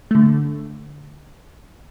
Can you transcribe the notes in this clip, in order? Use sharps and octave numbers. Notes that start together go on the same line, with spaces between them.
D3 A3